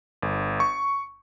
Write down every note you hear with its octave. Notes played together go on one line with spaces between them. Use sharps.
G1
C#6